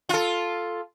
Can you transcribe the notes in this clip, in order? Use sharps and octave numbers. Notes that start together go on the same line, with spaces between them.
F4 A4